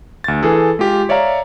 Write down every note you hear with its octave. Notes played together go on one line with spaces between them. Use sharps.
D2 A6
E3 G#4 A4
G#3 F4 G4
C#5 D5 E5 F5 A#5